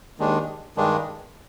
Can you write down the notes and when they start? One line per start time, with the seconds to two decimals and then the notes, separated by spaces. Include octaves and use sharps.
0.18 D#2 D#3 G#3 D4
0.76 G2 D#3 G#3 D4